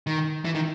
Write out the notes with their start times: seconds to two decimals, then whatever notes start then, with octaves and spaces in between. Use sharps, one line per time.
0.07 D#3
0.45 E3
0.55 D#3